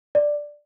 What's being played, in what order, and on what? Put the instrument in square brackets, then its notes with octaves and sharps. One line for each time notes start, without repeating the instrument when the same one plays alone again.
[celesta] D5